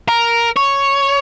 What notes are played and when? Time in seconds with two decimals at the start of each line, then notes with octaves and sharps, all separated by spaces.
0.09 A#4
0.57 C#5